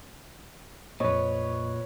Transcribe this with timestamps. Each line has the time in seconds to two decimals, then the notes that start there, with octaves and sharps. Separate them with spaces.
1.00 F2 A#2 B4 C#5 D#5